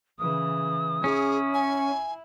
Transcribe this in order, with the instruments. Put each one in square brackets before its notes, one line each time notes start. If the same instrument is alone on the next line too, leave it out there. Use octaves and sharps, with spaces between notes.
[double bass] C#3 E3 [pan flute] D#6
[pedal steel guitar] C#4 [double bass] E4 [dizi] G#4
[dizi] G#5